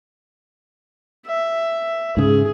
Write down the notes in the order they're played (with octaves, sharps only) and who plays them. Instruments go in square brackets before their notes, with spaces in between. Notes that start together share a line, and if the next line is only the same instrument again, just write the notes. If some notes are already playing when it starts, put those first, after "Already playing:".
[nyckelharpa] E5
[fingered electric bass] G#2 C#3 [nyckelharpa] G#4